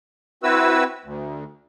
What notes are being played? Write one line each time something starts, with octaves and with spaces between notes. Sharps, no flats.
C4 E4 F#4 B4 E6
D2